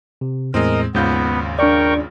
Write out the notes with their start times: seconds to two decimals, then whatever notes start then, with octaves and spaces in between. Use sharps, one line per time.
0.21 C3
0.54 E2 A2 G#3 C4 A#4 D#5
0.95 G#1 D#2 G#2 C#3 B3 F4 G6
1.59 D4 A#4 D5 G5 C#6